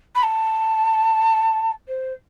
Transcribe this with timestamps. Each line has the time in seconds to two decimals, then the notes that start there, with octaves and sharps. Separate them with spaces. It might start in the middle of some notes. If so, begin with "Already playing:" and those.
0.15 B5
0.23 A5
1.88 C5